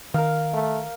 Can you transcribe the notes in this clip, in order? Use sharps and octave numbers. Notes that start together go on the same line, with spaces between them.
D#3 A#4 F5
A3